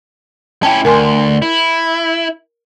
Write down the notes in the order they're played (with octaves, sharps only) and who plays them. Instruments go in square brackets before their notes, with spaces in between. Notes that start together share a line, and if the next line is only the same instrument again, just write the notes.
[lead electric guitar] C#4 E4 [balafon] G5 A5
[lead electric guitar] D2 [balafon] A#4 G#5 C6
[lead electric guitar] E4